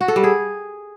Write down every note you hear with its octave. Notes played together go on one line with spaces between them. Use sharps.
F#4
A4
G3
G#4